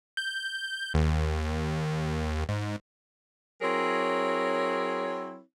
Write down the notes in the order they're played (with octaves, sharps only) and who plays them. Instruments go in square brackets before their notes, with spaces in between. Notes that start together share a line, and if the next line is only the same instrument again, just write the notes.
[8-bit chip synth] G6
D#2
G#2
[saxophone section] F#3 C4 E4 G#4 A#4 C#5